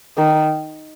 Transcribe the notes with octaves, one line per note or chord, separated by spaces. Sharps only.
D#3